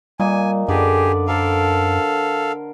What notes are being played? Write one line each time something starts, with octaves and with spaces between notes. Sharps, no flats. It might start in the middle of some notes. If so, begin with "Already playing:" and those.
A#2 G3 D#5 G#5
F#2 D3 G4 G#4 B4 D5
A4 A#4 C5 F5 A5